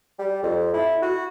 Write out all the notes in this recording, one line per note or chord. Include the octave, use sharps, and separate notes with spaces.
G3
F2
E4
F#4